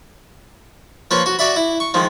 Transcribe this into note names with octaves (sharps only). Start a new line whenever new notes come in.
F3 A#3 B4 C#5
F#4
F#4 D5 E5 B5
E4
C#6
D#3 F3 G#3